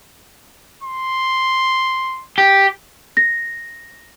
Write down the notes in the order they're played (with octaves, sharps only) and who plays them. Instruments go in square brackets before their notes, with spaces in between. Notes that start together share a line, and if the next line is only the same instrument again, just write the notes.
[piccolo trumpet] C6
[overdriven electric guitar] G4
[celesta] A#6